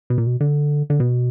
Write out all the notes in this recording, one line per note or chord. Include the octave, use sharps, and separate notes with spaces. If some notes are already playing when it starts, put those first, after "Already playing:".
B2
A#2
B2
D3
D3
B2